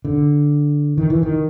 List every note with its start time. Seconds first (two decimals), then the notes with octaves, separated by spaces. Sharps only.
0.05 D3
0.98 D#3
1.10 E3
1.23 D#3